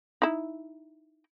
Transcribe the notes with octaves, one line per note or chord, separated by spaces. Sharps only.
D#4 E4